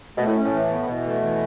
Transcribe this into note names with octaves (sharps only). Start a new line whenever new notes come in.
B2 A3
A2
C#4
A2
E3
B3
B2 E3
A3
E3